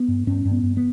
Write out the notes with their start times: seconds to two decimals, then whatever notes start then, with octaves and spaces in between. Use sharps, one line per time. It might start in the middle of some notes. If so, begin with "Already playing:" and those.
Already playing: B3
0.08 G2
0.27 G2 C#4
0.45 G2
0.51 B3
0.63 G2
0.77 B3